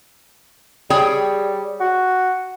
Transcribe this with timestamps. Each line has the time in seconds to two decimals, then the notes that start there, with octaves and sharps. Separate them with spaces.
0.90 G3 G#4 C#5 G5
1.80 F#4